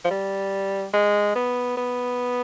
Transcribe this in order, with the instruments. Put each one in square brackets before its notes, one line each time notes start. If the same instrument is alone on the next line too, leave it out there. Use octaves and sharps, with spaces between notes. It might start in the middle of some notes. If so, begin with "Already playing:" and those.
[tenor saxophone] F3
G3
G#3
B3
B3